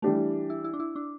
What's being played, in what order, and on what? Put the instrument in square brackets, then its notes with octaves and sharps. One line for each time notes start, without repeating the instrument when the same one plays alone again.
[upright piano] E3 G3 D4 G4 [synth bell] A3
[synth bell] E4
E4
D4
E4
D4